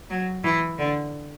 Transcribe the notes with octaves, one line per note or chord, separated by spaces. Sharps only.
F#3
E3
D3